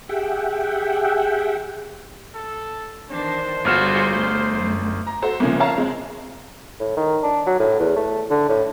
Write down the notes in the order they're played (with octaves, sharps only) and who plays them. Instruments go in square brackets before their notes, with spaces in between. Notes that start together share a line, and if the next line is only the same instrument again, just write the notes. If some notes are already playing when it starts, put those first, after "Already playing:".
[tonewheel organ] G4 G#4 E5 F#5 G5
[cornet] A4
[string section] D#3 E3 D4 [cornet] C5
[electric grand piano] G1 F6 E7 [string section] G3 G#4 G6 [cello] F4 F#4
[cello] A3
[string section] F#2
[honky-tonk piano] A#5
F#4 A4 C5
C2 A#2 C#3 F3
C#5 E5 F5 A5 A#5
G#3 C4
[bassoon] A2
D#3
D4
F#3
A2
E2
A3
D3
A2